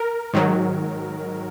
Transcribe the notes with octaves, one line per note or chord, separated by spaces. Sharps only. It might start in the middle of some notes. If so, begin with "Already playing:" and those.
Already playing: A#4
G#2 D#3 F#3